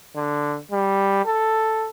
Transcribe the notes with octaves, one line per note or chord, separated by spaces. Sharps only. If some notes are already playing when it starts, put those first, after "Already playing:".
D3
G3
A4